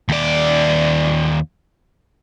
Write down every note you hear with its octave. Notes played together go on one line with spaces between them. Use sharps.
D#2 D5